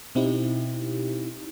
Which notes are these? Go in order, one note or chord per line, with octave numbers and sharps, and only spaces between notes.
B2 C4 D#4 E4 G4